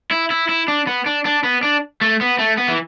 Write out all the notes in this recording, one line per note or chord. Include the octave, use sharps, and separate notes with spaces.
E4
E4
E4
D4
B3
D4
D4
B3
D4
A3
B3
A3
B3
E3